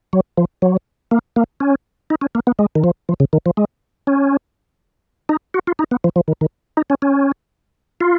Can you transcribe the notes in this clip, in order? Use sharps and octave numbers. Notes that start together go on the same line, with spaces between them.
F#3
F3
F#3
A#3
A#3
C#4
D#4
C#4
A#3
B3
G#3
D#3
F3
F3
C#3
D#3
F3
G#3
C#4
D#4
F#4
F4
D#4
B3
F3
F3
D#3
D#3
D#4
C#4
C#4
F4